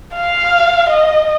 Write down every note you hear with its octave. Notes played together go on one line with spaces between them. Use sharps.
F5
D#5